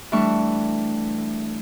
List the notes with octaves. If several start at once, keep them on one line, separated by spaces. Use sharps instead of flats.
E3 G3 A3 D4 C#6